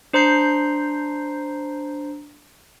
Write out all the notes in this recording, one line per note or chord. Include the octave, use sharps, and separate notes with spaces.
D4 C5 A#5 G6 C7